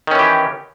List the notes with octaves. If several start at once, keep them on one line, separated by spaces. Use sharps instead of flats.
D#3 E3 C#4 G4